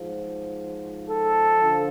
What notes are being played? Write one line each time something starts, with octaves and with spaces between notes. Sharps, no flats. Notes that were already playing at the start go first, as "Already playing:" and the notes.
Already playing: G#2 F3
A4
D3 F3